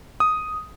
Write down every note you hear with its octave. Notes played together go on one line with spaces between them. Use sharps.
D#6